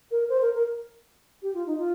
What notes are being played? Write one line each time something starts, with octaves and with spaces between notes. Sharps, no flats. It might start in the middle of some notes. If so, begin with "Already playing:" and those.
A#4
C5
A#4
A#4
G4
F4
D#4
F4